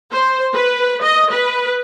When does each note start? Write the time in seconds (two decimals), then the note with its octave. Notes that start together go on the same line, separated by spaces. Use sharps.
0.11 C5
0.54 B4
1.02 D#5
1.32 B4